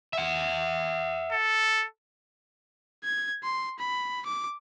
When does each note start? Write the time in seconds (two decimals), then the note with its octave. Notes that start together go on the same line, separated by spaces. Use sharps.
0.13 E5 F#5
1.32 A4
3.04 G#6
3.44 C6
3.79 B5
4.26 D6